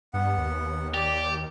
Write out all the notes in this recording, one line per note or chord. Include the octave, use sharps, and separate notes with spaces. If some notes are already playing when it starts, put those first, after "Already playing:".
G2 B3 F#5
D#2
G4 D5